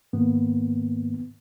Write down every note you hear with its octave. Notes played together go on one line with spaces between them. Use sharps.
G#2 D#3 A#3 B3